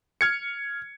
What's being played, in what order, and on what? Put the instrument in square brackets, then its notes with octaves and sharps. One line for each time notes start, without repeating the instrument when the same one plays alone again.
[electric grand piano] F6 G#6 C#7